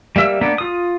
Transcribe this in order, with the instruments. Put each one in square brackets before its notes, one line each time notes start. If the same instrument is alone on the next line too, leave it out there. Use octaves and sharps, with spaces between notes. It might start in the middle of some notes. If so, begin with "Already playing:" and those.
[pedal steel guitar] G3 A#3 E5 E6
A#3 B3 D4
F4 D#6